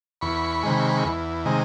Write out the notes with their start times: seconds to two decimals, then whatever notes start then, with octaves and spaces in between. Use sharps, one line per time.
0.21 E2 B5 C#6
0.63 C3 D#3 G#3
1.04 E2
1.45 C3 D#3 G#3